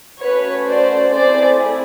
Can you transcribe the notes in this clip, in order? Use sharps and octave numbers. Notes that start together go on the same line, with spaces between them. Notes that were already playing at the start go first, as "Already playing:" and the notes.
A3 C#4 F#4 B4 C#5
C5 D5
A3 C4 E4 G#4 C5 D5